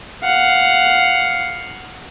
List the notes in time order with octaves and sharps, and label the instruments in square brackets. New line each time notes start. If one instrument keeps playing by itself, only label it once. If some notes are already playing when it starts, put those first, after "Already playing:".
[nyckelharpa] F5 F#5